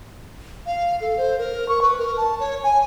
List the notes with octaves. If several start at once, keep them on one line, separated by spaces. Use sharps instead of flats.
F5
A4
C5
A#4
C#6
B4
A#4
A5
C#5
G#5